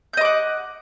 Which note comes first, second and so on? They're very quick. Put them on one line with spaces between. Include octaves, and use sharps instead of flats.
G6 D#5 D6 F#5